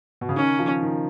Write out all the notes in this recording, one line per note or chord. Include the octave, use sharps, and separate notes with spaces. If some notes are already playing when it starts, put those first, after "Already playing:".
B2
C#3
D#3 C#4
F3
D#3